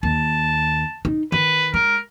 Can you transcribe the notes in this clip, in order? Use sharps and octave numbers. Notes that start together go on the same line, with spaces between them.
D#2 A5
D#4
D#3 B4
G#3 A#4